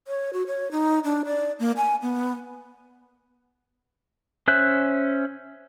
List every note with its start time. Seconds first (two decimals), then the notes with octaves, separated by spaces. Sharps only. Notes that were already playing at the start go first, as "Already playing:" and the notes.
0.07 C#5
0.33 F#4
0.47 C#5
0.71 D#4
1.04 D4
1.25 D5
1.59 A#3
1.77 G#5
2.02 B3
4.48 C#4 C5 E5 F#6